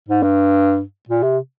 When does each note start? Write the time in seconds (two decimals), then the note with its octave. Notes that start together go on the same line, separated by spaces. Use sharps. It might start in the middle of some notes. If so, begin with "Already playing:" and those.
0.08 G#2
0.22 G2
1.09 A#2
1.23 C3